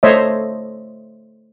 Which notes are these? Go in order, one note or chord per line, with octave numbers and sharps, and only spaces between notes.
A3 C5 C#5 D#5 E5